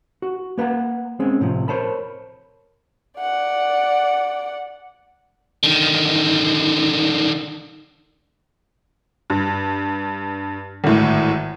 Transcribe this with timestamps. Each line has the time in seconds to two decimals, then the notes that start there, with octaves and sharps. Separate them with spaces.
0.22 F#4
0.58 A#3 B4 F#5 A#5
1.20 G#3 C4 C#4
1.41 A2 C3 F3
1.68 A#4 C5 C#5 A5 B5
3.21 D5 F#5
5.63 D3 D#3
9.30 G2
10.84 G#1 A2